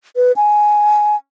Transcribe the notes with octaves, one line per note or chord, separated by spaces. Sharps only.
B4
G#5